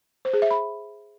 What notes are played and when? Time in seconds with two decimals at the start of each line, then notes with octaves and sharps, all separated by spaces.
0.25 C5
0.33 G#4
0.42 E5
0.51 B5